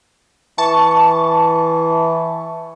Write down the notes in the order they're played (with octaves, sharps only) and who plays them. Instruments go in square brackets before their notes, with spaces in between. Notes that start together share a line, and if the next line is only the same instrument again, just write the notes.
[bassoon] E3 [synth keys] A5 C#6